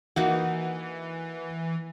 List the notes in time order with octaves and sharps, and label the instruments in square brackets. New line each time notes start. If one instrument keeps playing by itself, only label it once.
[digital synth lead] E3 [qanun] A#3 D#4 F#4 [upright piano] F#5